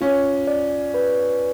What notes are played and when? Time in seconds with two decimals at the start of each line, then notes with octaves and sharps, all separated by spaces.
0.01 C#4 F4
0.47 D5
0.94 B4